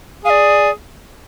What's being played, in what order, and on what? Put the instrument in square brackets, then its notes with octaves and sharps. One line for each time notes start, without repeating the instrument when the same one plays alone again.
[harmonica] G#4 [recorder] F5
[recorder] D5